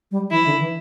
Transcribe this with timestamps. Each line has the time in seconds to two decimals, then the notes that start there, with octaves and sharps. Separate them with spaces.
0.11 G3
0.31 E3 E4
0.45 D3
0.60 E3